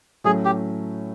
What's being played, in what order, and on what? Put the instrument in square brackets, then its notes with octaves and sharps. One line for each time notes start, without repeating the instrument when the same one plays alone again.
[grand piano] A2 F#3 A3 C#4 [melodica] G#4
[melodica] G4